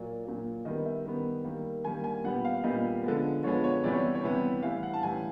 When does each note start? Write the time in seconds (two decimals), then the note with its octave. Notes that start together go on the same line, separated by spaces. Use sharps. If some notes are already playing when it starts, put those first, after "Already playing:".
Already playing: A#2 F#3 A#3 D5
0.25 A#2 F#3 A#3
0.65 D#3 G3 B3 D#5
0.85 E5
1.05 D#3 G3 B3
1.45 D#3 G3 A#3
1.84 D#3 G3 A#3 G#5
2.04 G#5
2.24 A#2 G3 B3 F#5
2.45 F5
2.64 A#2 G3 B3 D#5
3.03 D3 F3 G#3 B3
3.43 D3 F3 G#3 B3 C#5
3.64 C#5
3.84 C3 E3 G3 B3 D5
3.93 C#5
4.15 C#5
4.24 C3 E3 G3 B3
4.63 A2 E3 G3 F5
4.83 F#5
4.93 A5
5.03 A2 E3 G3 G#5